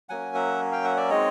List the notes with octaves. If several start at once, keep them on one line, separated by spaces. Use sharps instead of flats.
F#3 A#3 C#4 F#5 G#5
E5 F#5
F5 G5
E5 F#5
D5 E5
G#3 C4 D#4 C#5 D#5